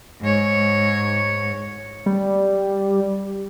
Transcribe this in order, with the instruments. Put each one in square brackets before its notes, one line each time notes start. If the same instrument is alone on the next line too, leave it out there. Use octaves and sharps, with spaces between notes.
[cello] G#2 C#5
[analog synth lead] G3